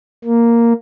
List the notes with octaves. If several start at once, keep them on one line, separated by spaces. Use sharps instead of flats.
A#3